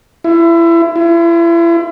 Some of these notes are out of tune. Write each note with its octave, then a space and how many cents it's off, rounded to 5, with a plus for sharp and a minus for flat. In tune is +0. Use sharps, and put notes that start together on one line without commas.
E4 +25
E4 +35